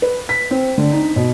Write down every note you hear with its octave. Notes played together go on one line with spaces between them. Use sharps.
B4
B6
C4
D3
D#4
B2